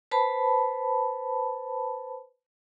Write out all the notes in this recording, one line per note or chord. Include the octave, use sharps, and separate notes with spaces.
B4 C5 A5 B5